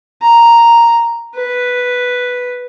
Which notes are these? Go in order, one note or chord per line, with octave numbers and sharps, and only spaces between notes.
A#5
B4